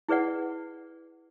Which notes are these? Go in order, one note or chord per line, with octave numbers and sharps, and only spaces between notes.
E4 G#4 B4 D5 F#5